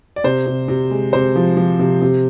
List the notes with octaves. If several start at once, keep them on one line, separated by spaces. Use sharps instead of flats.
D5
C3 C5
C3
C3
G#3
C3 C5
F3
F3
C3
C3